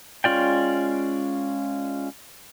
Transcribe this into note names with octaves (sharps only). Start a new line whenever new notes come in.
G#3 C#4 F4 D5 G5